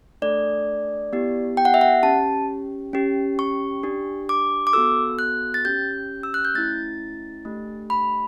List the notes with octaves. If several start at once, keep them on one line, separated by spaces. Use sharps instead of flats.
A3 D4 A4 D5
B3 E4 G4
G5
F#5
E5
F#5
C#4 G4 A5
C#4 G4
C#6
D4 G4
D6
D6
B3 F#4 A4 E6
F#6
A6
C#4 G4 G6
E6
F#6
G6
A3 C#4 E4 A6
A3 D4 G4
B5